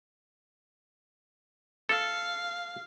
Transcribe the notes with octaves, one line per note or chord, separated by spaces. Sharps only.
A4 F5